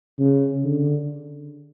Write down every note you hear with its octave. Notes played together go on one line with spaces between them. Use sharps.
C#3
D3